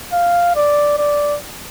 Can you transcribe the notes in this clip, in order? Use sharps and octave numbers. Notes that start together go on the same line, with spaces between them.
F5
D5
D5